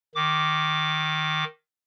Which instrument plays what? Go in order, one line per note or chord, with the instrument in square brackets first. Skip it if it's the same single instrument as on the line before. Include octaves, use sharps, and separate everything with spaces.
[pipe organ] D#3 D6